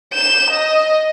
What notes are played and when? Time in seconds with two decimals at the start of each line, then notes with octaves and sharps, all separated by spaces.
0.13 G6 E7
0.51 D#5